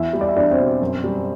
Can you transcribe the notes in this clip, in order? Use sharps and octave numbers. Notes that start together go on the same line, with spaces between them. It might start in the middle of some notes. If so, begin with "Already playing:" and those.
Already playing: E2 E4 E5
G3
D5
E5
E2 D4 D5
C4 C5
B2
F#2
G3